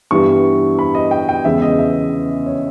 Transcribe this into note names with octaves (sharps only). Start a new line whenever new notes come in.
G2 E3 G3 B3 C#6
B5
D#5
G5
G5
E2 C#3 G#3 B3 E5
D#5
E5
C#5